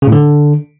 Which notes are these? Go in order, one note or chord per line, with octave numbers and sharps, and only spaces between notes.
C#3
A2
D3